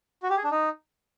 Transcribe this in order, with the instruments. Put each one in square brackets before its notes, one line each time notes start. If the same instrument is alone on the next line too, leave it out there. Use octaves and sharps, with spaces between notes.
[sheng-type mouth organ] F#4
G4
G#4
D4
D#4